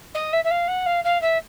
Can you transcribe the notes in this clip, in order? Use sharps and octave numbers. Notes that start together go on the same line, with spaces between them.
D#5
E5
E5
F5
F#5
F5
F5
E5